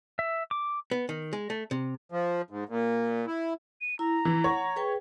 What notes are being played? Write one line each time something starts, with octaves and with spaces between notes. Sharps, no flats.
E5
D6
B3
D#3
G#3
A3
C3
F3
G#2
A#2
E4
D#7
E4 A#5
E3 E4
C#5 F#5
G#4 B4 G5